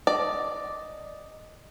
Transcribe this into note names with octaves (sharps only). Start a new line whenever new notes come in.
D5 D#5